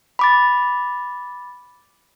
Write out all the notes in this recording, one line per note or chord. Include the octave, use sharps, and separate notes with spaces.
B5 D6 A6